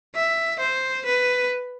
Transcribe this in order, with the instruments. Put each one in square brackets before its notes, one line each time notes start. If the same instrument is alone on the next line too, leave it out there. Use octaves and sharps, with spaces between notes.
[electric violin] E5
C5
B4